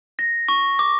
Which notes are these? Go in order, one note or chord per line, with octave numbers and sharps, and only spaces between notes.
A#6
C#6
D6